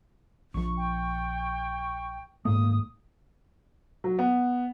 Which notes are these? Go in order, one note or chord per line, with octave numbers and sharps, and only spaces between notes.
A#1 F3 C#6
G5
D#1 G#2 A3 A#3 D#6
F#3
B3